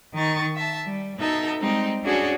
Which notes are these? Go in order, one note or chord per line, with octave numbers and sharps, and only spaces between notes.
D#3 D#4 C#6 A6
E5 A5
G3
B2 D#4 A4 E5
G3 G#3 C4 D#4 G4
C#4 D4 F#4 G#4 A4 C#5